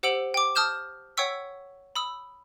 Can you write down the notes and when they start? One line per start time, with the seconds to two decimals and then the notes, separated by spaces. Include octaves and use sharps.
0.03 G4 C5 F#5 E6 D7 F#7
0.34 G5 D6
0.55 A5 D#6 F6 G6 E7
1.17 C#5 F#5 G5 C#6 E6 B6
1.96 B5 D#6 E6